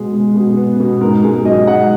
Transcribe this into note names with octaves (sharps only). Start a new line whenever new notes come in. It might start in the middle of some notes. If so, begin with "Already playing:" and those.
Already playing: B2 G#3 G#4
G#3
B2
B3
B2
G#2 A#4
G#2 G#4
F#3 D#5
G#2 F#5